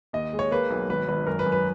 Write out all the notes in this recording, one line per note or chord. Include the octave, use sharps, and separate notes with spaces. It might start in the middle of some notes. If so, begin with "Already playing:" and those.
D#2 D#5
G#3
C#5
A#3 B4
B1
G#1 B4
G#1 B4
F#2 A#4
B4
F#2
B4